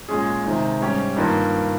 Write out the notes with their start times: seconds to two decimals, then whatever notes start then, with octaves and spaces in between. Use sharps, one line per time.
0.09 A#2 G#3 C#4 G#4
0.45 C3 D#3 G#3
0.80 G#2 G3 C#4 G4
1.17 G2 D#3 A#3 F4